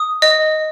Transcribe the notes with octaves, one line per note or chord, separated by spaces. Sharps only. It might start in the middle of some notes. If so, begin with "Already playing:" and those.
Already playing: D#6
D#5